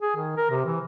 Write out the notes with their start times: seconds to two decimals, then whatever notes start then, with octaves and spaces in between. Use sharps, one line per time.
0.01 G#4
0.17 D#3
0.37 A#4
0.50 C3
0.65 E3